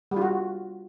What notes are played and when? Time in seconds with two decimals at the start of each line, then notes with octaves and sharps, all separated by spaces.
0.11 G3
0.16 F4
0.21 F#4